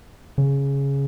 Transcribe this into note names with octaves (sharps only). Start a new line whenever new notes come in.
C#3